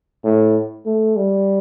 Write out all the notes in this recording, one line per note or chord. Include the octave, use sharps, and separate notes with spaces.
A2
A3
G3